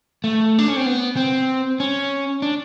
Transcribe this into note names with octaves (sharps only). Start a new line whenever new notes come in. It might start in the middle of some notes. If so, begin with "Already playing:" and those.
A3
D4
C#4
C4
B3
C4
C#4
D4